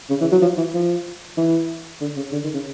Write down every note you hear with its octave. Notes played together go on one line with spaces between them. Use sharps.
C#3
E3
F#3
F3
E3
F3
E3
D3
C#3
D3
D#3
C#3